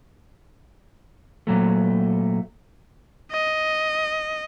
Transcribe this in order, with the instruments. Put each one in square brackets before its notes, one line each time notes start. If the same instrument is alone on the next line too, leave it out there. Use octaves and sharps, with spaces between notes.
[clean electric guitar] A#2 F#3 A3
[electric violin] D#5